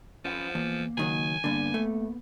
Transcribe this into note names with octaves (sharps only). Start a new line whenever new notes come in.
F3 C#4 C5 F#5
E2 A#3
C#2 D#3 F#3 G#5
G2 D3 A#3 B3
A3